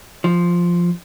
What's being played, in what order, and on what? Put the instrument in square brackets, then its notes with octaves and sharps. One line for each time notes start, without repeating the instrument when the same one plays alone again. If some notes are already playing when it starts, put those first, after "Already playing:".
[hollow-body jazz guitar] F3